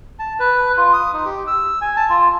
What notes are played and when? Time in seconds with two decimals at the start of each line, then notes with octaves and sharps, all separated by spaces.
0.19 A5
0.39 B4
0.77 F4
0.93 D#6
1.13 D#4
1.25 G4
1.47 E6
1.81 G#5
1.96 A5
2.09 F4